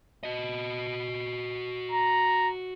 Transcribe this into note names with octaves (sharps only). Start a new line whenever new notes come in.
F#4 D#5
A#5